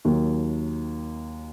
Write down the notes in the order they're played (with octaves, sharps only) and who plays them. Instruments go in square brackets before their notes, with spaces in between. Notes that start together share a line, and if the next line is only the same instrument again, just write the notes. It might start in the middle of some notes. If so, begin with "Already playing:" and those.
[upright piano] D#2 D#3 F#3